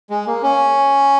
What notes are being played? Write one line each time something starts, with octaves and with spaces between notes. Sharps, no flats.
G#3
A#3
C#4